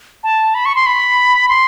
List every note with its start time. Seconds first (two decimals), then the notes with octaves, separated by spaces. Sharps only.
0.23 A5
0.55 B5
0.65 C#6
0.75 C6
0.86 B5
1.49 C6